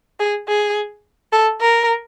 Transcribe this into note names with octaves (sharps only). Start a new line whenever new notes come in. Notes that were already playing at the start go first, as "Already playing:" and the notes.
G#4
G#4
A4
A#4